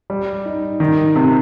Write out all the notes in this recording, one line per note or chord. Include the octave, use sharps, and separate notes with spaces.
G3
D#4
D#3
C3